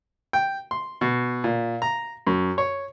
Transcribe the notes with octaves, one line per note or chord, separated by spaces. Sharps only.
G5
C6
B2
A#2
A#5
F#2
C#5